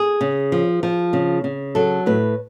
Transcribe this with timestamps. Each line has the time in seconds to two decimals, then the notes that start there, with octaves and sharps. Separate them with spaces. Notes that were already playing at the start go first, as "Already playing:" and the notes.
Already playing: G#4
0.21 C#3
0.52 F3
0.83 F3
1.13 C#3
1.44 C#3
1.75 F#3 A4
2.06 A2 B4